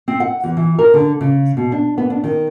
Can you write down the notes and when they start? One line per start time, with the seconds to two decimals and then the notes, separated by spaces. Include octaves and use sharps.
0.08 C4
0.20 F#5
0.44 E2
0.57 E3
0.79 A#4
0.94 D3
1.21 C#3
1.57 B2
1.72 D4
1.98 B3
2.10 D4
2.24 D#3